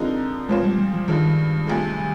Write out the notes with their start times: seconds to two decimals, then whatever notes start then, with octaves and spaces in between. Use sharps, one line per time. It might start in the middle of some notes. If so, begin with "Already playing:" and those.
Already playing: D3 F3 G#3 C4 D#4 A#4
0.49 A#2 F3 G#3 C4 F4 C5
0.63 G3
0.78 G3
0.94 F3
1.08 G2 D#3 F3 G#3
1.67 D2 C3 F3 G#3